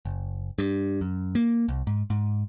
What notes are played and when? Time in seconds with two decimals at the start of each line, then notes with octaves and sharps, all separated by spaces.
0.05 F#1
0.58 G2
1.01 F#2
1.35 A#3
1.68 C2
1.87 G#2
2.10 G#2